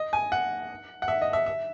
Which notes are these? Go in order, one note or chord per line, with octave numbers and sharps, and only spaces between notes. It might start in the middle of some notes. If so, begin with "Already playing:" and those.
Already playing: D#5
G#5
F#5
F#5
E5
D#5
E5
E5